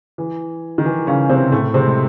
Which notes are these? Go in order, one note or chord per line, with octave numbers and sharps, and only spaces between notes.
E3
D#3
E3
C#3 C#4
C3 C4
A2 A3
C3 C4
G#3